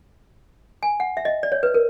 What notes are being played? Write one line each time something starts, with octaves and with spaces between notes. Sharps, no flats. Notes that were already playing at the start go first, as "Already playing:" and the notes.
G#5
F#5
E5
D#5
D5
C#5
B4
A#4